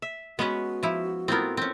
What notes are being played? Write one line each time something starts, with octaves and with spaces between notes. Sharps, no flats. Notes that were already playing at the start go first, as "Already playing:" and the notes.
E5
G#3 B3 C#4 F#4 B4
F3 E4
A2 B3 C4 F4 A#4
C4 C#4